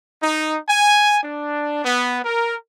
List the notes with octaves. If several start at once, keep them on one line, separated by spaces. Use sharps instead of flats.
D#4
G#5
D4
B3
A#4